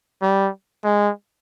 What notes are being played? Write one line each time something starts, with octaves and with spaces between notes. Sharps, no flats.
G3
G#3